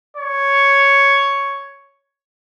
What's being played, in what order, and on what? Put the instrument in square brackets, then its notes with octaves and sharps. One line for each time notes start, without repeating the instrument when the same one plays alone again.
[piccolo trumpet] C#5